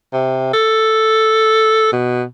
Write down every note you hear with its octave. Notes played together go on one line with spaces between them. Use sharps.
C3
A4
B2